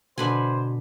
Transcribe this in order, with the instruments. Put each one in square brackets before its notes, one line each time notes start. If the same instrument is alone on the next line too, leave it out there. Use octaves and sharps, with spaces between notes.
[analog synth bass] B2 [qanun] D3 B4 G#5 [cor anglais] C5